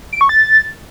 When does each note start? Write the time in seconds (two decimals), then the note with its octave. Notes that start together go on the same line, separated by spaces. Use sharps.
0.13 D7
0.21 C#6
0.29 A6